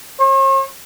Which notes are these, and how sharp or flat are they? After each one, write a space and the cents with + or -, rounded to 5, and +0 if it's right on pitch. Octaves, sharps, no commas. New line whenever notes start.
C#5 -45